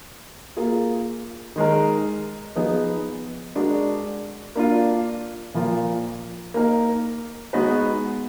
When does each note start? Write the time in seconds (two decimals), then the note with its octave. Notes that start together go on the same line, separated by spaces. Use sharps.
0.57 A#3 F4 G#4
1.56 D#3 G#3 D#4 A#4
2.56 F3 B3 D#4 G#4 B4
3.56 G#3 D4 F#4 A#4
4.55 A#3 D4 F4
5.54 A#2 F3 A#3 F4
6.54 A#3 D#4 A#4
7.53 G#3 B3 D#4 F#4 B4